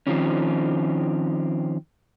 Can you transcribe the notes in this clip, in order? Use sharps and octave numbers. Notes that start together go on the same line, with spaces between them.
D#3 F3 C4 C#4